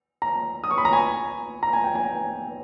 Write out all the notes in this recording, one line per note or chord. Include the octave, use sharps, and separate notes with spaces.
A#5
D#6
C#6
B5
A#5
G#5
A#5
G#5
G5
G#5